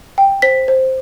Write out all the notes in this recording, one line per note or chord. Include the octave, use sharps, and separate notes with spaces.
G5
C5 B6
C5